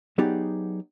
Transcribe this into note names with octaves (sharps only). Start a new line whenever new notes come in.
F#3 B3 D#4 G4 G#4 D5